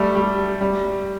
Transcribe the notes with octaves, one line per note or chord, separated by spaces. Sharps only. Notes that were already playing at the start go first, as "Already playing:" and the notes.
Already playing: G3 A3
G3
G3